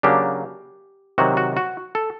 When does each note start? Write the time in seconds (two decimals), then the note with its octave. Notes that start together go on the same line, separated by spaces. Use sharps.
0.03 C#3 F#3 A#3 D4 G4
1.18 C3 D#3 F#3 F#4
1.37 F#4
1.57 F#4
1.95 A4